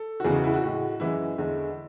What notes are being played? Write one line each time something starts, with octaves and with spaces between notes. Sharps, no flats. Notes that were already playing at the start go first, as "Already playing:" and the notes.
Already playing: A4
F#4
E2 C#3 E3 G#3 G#4
F#4
E4
F#4
A2 G#3
F#2 E3 G#3 E4
E2 D3 G#3